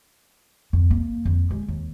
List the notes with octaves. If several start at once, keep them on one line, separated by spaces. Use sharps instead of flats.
F2
A#3
F2
G#3
D#2